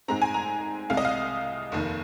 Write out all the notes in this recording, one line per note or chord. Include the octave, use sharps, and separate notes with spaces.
G#2 G#3 C4 A#5
G#5
A#5
C2 C3 G#3 F5
D#5
F5
F1 D#2 D#3